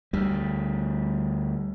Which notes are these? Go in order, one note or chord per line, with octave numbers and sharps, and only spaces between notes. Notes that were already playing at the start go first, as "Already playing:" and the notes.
D2 G3